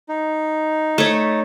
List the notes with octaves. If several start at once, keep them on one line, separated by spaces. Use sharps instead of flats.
D#4
A3 C#5